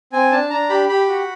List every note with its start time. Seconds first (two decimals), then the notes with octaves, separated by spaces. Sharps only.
0.13 C4 G#5
0.31 D4 A5
0.50 D4 A#5
0.69 G4 B5
0.88 G4 B5
1.08 F#4